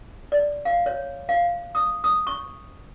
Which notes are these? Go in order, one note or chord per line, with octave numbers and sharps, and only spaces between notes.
D5
F5
C#5
F5
D#6
D#6
C#6